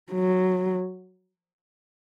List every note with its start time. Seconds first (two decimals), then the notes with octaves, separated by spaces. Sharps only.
0.12 F#3